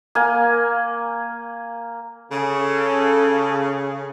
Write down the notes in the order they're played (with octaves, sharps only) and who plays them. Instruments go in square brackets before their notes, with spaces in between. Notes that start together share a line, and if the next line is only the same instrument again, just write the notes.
[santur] A#3 G#5
[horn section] C#3 [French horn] A4